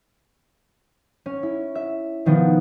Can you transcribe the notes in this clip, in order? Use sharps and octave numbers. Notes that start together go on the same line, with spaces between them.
C#4
E4
E5
B2 D#3 F3 B3